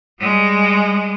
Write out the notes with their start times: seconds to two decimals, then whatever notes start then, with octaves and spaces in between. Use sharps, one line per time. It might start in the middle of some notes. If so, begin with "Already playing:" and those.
0.21 G3 G#3